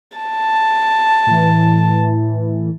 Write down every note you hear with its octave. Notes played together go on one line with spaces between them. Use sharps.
A5
A2 E3